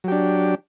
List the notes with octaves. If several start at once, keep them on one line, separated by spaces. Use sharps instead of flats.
F#3 D4 G4